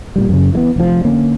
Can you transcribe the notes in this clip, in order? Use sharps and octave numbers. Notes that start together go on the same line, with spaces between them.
A#2 D3 G3
F#2 C#3
E3 G#3 B3
F1 F2 F3
D3 A#3 C#4